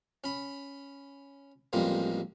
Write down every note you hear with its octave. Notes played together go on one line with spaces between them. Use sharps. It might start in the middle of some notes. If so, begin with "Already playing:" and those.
C#4 B5
A1 F2 G3 G#3 A#3